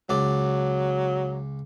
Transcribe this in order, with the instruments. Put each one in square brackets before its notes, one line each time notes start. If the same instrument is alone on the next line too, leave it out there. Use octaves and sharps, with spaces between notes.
[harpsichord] C#2 D5 [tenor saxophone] F#3